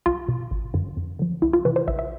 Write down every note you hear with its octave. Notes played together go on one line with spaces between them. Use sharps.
B1 F4
B2
G#1
F#2 D3
F2
D3 F3
C2 E4
F4
C3 E3 B4
C5
A#1 E5
E5